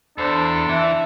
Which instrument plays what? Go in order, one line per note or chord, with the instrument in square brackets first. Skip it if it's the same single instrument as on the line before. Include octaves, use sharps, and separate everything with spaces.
[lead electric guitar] E2 [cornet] D4 [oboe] A4 [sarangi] C5
[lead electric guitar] E3 [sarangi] E5